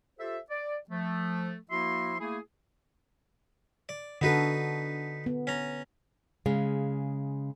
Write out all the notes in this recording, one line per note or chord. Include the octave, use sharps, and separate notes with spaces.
F4 G4 A4 C5 E5
D5
F3 A3
F3 A#3 E4 F#4 E5 C6
A3 A#3 E4 G#4
D5
D3 B3 D#4 F#4 A4 B4
B3
C#4 A#5
C#3 G#3 F5